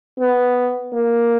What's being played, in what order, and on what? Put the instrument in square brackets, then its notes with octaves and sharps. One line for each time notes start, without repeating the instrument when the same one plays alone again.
[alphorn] B3
A#3